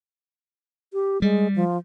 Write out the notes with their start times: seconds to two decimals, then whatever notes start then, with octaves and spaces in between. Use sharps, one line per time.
0.93 G4
1.22 G3 G#3
1.56 F3